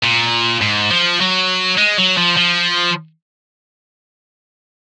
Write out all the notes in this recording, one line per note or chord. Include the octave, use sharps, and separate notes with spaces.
A#2
G#2
F3
F#3
G#3
F#3
F3
F3